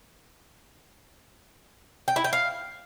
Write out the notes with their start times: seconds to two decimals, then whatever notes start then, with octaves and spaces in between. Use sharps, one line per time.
2.08 G5
2.16 E4
2.24 G5
2.33 F5